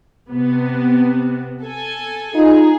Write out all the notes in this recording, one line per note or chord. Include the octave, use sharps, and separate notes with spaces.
C3 B3
A4 G#5
D#4 F4 G#4